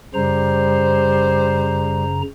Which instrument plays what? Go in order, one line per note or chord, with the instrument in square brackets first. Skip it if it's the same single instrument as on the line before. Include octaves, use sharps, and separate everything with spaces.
[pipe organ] F#2 C#3 A#5 [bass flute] G3 [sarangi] C5